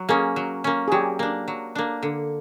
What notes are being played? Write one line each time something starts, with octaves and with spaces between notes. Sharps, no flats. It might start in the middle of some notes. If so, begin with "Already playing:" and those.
Already playing: F#3
A#3 C#4 G#4
F#3
A#3 C#4
G#4
F#3 G4
A#3 D4
F#3
A#3 D4
D3